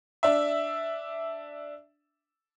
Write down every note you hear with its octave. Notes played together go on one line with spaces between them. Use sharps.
D4 E5